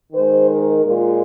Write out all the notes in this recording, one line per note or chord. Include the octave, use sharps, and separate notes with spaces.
D#3 G#3 C5
A#4
A#2 G#3 F4